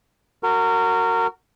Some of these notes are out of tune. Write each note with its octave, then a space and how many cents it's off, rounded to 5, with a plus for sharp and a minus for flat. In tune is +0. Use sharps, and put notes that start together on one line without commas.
F#4 +0 A#4 -25